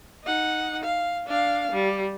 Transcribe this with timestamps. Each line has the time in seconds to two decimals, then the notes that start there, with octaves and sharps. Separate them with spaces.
0.24 D#4 F#5
0.84 F5
1.26 D4 F5
1.72 G3